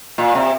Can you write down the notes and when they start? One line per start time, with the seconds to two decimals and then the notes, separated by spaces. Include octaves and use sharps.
0.18 A#2
0.35 C3